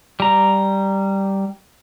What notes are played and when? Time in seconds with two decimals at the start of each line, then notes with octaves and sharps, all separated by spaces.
0.20 G3 A#5